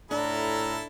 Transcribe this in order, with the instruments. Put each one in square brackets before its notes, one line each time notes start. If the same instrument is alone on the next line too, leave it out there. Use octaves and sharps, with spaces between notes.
[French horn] A2 [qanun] D4 [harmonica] E4 A4 [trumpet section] F4 B4 A#5